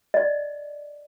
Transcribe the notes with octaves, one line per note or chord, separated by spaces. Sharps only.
D5 D#5